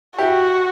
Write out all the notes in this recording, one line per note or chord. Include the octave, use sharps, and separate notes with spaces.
E4 F#4 G4